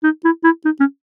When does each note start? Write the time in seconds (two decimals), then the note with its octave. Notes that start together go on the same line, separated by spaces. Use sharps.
0.04 D#4
0.25 E4
0.44 E4
0.65 D#4
0.80 C#4